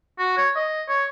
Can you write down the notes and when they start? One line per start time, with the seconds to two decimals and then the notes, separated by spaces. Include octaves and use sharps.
0.19 F#4
0.37 C#5
0.56 D#5
0.88 C#5